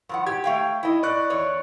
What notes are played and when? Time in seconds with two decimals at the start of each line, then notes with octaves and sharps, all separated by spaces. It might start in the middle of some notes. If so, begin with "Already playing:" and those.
0.09 G2 F3 F#5
0.27 G4 G#6
0.44 A3 F5 G5
0.83 E4 D#5
1.03 D5 C#6 F#6
1.30 E2 C#5